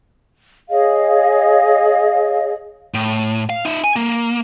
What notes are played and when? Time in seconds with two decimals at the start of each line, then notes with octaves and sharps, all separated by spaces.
0.70 G#4 C#5 D#5 F5
2.94 A2
3.50 F5
3.65 D#4 E5
3.84 G#5
3.96 A#3